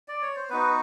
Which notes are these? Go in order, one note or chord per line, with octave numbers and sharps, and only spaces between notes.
D5
C#5
C5
B3 D#4 F#4 B4